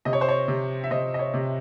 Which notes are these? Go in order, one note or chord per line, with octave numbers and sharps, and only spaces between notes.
C3 D#5
C#5
C5
C#5
C3
E5
C3 C5 D#5
D#5
C#5
C3